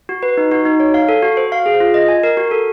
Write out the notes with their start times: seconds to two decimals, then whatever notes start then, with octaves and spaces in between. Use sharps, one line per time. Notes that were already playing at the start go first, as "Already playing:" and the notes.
0.09 F#4
0.23 B4
0.37 D#4
0.51 F#4
0.65 D#4
0.80 C#5
0.94 F5
1.09 A4
1.22 F#4
1.37 C5
1.52 F5
1.66 G#4
1.80 F4
1.94 D#5
2.08 G#5
2.23 A#4
2.37 F#4
2.51 A4